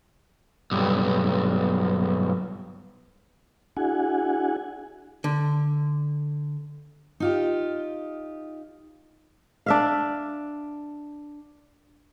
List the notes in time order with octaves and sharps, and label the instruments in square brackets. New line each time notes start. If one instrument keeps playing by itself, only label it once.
[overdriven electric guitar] B1 G2
[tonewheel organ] D4 E4 F#4 G#4 F#5 G#5
[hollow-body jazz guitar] D3
[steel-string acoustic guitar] D#4 F4 G4
[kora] D4 E5 F5